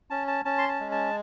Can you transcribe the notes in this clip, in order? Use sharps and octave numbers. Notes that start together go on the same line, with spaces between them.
C#4 A5
A5
C#4 A5
C6
A5
G#3
A5